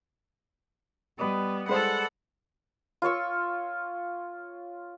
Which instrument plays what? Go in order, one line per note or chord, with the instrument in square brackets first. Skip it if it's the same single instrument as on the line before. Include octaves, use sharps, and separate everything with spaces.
[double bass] G3 [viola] B3 [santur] B4 D5 D#5
[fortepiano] G#3 C5 [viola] A4 F#5 [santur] B4 A5
[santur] F4 C#5 C#6 E6